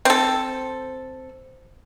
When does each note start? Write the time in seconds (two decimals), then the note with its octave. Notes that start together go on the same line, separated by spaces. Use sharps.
0.05 C4 A4